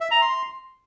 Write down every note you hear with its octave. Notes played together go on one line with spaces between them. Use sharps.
E5
A#5
C6